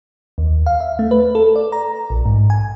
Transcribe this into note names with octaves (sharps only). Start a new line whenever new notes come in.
D#2
F5
E5
A3
B4
A4
D5
A#5
A#1
G#2
G#5